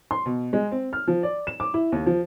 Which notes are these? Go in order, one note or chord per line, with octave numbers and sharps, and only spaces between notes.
C6
B2
G#3
C4
F6
F3
D5
E7
D6
E4
D#2
F3